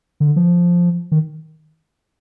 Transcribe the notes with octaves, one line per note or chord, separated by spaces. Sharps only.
D3
F3
D#3